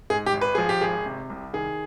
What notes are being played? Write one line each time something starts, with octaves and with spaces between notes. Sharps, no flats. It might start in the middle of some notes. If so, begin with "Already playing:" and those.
G#2 G#4
G4
G#1
B4
F3 G#4
G4
G#1 G#4
C3
C2
D#3 G#4